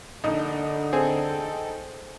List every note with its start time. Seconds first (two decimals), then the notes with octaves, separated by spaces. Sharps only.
0.24 A#1 D3 D#4 A4
0.93 C4 G#4 A4 G5